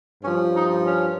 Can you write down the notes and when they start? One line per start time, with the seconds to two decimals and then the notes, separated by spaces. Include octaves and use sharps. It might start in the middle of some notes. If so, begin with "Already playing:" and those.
0.23 G2 F3 C#4
0.54 D#4
0.85 C#4